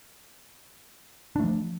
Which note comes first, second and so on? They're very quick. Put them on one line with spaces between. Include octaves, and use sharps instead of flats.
D4 A3 F3